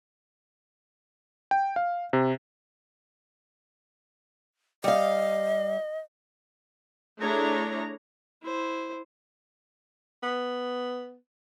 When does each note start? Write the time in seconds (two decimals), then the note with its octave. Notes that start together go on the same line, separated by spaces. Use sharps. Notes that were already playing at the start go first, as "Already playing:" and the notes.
1.51 G5
1.76 F5
2.13 C3
4.84 G3 D#5 F5
7.19 A3 D4 E4 G#4 C#5 A#5
8.42 E4 C5
10.23 B3